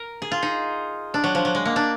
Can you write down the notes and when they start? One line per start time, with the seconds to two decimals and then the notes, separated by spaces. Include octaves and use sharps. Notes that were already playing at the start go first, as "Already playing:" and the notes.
Already playing: A#4
0.22 G#4
0.31 F4
0.42 D#4
1.14 D4
1.24 F#3
1.35 F3
1.45 F#3
1.55 G#3
1.65 A#3
1.76 D4